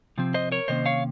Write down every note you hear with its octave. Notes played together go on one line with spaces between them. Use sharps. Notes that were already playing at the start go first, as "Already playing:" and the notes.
C3 F3 C4
C5 D#5
A#4 C#5
C3 D#3 A#3 C#4 C5 D#5
C#5 F5